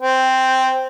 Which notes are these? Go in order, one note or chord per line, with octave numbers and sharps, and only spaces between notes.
C4